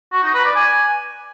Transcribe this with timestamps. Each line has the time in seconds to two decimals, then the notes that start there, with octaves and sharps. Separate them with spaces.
0.13 F#4
0.23 D#4
0.34 B4
0.45 D5
0.56 G#5